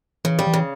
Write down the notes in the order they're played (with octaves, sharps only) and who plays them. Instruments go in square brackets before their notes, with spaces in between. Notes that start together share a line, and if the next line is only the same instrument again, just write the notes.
[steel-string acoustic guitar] C#3 [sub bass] E3
[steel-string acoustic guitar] G3
[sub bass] E3
[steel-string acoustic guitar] C#3